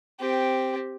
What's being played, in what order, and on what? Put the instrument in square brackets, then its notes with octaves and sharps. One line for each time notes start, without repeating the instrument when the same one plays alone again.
[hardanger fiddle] C4 G4